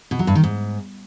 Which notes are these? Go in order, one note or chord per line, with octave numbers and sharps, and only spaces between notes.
B2
F#3
G2
D#3
G#2